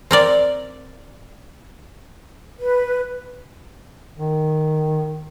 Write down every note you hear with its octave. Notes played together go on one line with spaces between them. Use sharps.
C4 A#4 D5
B4
D#3